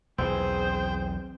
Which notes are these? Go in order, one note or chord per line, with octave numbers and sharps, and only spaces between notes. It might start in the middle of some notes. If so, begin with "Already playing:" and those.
B1 E2 E3 C4 G#4 C5 G5